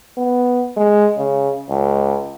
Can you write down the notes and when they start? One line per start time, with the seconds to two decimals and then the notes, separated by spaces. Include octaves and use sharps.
0.18 B3
0.77 G#3
1.18 C#3
1.70 C#2